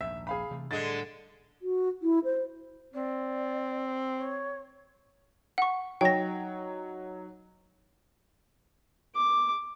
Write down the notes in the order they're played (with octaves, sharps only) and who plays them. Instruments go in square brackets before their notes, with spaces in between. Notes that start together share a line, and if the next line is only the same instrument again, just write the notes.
[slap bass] A#1 D#2 G#2 [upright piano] E5
[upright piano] G#4 F5 B5
[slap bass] C3 E3 A3
[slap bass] A2 G3 [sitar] D3 G#3 [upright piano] A6
[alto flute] F#4
E4
C5
[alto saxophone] C4 [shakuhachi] D5
[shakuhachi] C#5
[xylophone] F#5 C#6
[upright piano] F#3 D#4 C#5 [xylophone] G5 A#6
[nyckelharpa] D6